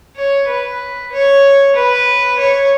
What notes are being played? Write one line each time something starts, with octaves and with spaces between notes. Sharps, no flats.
C#5
B4
C#5
B4
C#5